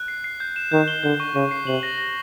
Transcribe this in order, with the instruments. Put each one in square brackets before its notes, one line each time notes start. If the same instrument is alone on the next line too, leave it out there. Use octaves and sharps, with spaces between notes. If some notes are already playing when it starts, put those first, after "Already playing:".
Already playing: [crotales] F#6
C7
C7
G6
E7
[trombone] D#3 [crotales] G6
[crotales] G7
[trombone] D3 [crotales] G6
[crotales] C#6
[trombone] C#3 [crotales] C#6
[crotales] C7
[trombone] C3 [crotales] F#7
[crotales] A#6
A#6